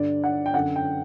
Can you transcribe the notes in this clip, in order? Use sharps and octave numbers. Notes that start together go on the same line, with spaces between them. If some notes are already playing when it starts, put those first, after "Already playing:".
Already playing: G2 D3 D5
F#5
G5
F#2 D3 F#5
G5